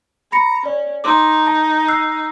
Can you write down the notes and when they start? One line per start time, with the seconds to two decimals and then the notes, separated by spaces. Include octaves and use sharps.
0.32 A#5 B5 A#6 C#7
0.66 C#4 D5
1.04 D#4 A#5 C6 D6
1.46 A5 A#6
1.88 E6 F#6 C7